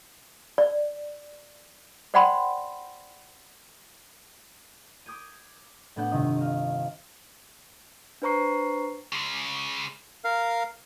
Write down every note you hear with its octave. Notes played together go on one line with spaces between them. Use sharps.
D5
C5 D5 F#5 G5 B5 C6
D6 D#6 G6 G#6 D#7
A2 B3 D4 F#5 G6
G1 C3 D#3 D#5 D#6
D#5 F5
D4 B4 C5 A#5 C#6 C7
C#3 G#3
A#4 F5